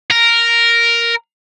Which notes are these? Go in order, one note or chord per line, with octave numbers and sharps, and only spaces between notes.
A#4